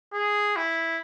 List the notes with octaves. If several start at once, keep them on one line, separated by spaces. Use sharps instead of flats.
G#4
E4